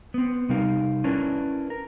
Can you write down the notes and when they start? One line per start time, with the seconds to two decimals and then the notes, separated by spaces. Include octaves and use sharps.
0.14 B3 C4
0.49 C3 G3 D#4 A#4 F5
1.04 C#4 D4 E4 A#4 B4
1.70 A#4